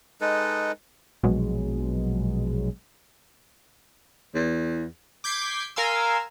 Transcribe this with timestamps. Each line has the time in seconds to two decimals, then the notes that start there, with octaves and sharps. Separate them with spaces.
0.21 G#3 D#4 A4 B4
1.23 A#1 B2 F#3 G#3
4.35 E2
5.24 D6 G6 G#6 B6 C7
5.76 A#4 F5 G#5 C6 E6